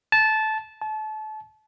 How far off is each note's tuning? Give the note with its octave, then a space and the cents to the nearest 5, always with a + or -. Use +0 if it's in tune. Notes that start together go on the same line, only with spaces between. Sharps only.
A5 -15
A5 -30